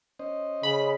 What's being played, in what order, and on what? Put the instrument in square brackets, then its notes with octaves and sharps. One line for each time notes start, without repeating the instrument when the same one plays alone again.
[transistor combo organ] C#4 C5 D#5
[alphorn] C#3 [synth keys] B5